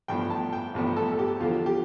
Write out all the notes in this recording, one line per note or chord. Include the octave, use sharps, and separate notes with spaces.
A1 G2 F3 B3 G5
A5
G5
A1 G2 F3 B3
A4
A4
G4
E2 D3 F3 F4
G4